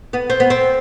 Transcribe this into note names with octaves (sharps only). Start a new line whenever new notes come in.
B3
C4
B3
C4